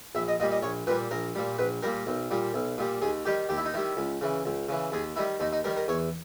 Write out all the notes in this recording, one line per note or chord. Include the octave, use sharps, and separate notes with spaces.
A#1 E5
D#5
A#2 G3 D#5
D#5
A#1 C#5
A#2 G3 B4
A#1 A#4
A#2 G3
A#1 B4
A#2 G3 A#4
B1
A#2 G3
B1
A#2 G3
D#2 G#4
D#3 G3 G4
D#2 G4
E4
D#4
D#3 G3 E4
C#2
C#3 E3
C#2
C#3 E3
D#2 G#4
D#3 G3 E4
D#2 D#4
D#4
D#3 G3 A#4
A#4
E2 C#5